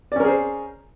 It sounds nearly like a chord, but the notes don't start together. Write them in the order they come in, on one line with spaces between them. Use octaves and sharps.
D5 C#4 A#4 G#4 C5